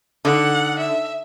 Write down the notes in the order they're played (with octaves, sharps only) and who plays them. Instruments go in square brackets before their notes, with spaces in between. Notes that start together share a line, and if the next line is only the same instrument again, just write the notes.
[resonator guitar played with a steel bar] D3 [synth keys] D#4 A4 D#6 [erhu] F#5
[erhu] E5